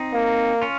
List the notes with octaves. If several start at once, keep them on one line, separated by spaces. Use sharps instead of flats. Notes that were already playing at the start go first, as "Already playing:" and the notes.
Already playing: C4 D#4
A#3
C#4 F4